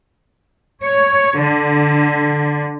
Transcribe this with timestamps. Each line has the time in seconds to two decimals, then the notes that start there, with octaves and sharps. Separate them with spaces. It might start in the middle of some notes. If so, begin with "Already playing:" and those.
0.82 C#5
1.38 D3